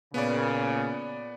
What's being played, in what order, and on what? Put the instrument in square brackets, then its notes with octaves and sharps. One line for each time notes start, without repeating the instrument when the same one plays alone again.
[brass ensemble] A#2 C#3 [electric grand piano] B3 D5